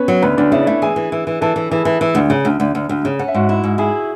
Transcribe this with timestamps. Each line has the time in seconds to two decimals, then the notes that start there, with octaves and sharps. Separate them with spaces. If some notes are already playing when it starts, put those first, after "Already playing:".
Already playing: B3 C#4 B4 C#5
0.08 F#3
0.22 D2 B3 B4
0.37 D2 D4 D5
0.52 C#3 E4 E5
0.60 D5
0.66 A3 E4 E5
0.82 E3 G#4 G#5
0.96 E3
1.12 E3
1.27 E3
1.41 E3 A4 A5
1.56 E3
1.70 E3 G#4 G#5
1.85 E3
2.01 E3
2.15 D2
2.30 C#3
2.45 D2
2.60 D2
2.75 D2
2.89 D2
3.05 C#3
3.19 C#4 F#5
3.28 E5
3.34 G#2 F#4 F#5
3.49 E4
3.64 G#2
3.78 E4 G#4 G#5